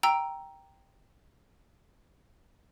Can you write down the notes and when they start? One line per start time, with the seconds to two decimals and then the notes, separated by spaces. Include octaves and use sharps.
0.03 G5 A#5 E6 D7